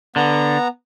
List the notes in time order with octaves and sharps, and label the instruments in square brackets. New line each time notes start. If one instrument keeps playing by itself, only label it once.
[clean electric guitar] D3 [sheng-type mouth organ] B3 A#5